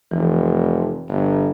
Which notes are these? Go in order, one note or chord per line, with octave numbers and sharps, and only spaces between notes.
F1 E3
G1